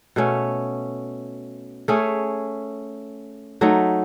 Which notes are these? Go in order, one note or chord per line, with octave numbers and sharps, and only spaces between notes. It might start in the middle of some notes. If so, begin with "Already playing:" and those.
B2 A3 C#4
A3 C#4 G#4
F#3 A3 D#4